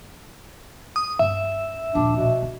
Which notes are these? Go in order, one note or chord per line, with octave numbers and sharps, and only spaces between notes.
D#6
G2 C#4 E5
A#1 D#2 D4
B2
D4